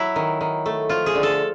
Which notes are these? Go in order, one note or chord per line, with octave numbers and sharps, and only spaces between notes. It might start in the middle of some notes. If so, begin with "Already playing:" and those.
Already playing: F#3 E4
D#3
D#3
A3
F3 F4
G#4
D3
A4